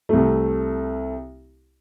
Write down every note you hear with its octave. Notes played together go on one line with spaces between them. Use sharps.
C2 A3